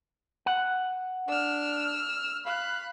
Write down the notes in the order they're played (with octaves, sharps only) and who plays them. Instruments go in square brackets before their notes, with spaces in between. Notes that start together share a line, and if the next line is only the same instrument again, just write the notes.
[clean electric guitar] F#5
[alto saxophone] D4 [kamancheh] E6 F6
[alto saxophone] F5 [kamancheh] B5 F#6